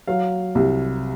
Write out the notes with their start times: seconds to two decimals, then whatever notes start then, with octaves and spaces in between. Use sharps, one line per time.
0.07 F#3 F5
0.55 C2